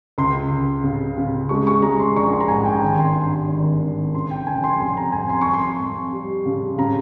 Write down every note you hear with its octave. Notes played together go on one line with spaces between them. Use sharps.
C#2 C6
C#2
C#3
C#3
G#3 C#6
C#6
G#3 A#5
C6
A#1 C#6
C6
A#5
G#2 G#5
G5
G#1 G#5
C6
G2 C6
G#1
G#1
C#3 C6
G5
F1 G#5
C6
F2 C6
A#5
F2 G#5
C6
F2 C#6
C6
F2
G3
C#3
C#3 A#5